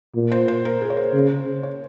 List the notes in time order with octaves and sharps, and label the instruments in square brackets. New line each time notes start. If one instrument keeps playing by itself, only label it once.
[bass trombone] A#2
[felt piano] C5
C5
A#4
G#4
C#5
C5
[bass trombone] C#3
[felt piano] C#5